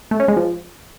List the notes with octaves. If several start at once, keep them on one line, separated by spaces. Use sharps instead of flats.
A3
C#4
G#3
F3